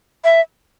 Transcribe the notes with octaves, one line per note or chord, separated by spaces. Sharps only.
E5